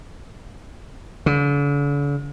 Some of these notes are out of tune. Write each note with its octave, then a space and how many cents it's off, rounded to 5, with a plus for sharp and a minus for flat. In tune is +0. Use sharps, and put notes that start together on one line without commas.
D3 -45